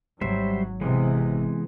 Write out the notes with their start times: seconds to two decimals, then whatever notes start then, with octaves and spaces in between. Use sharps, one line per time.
0.21 G#1 F#3 G3 C5 E5
0.81 C3 E3 G#3 B3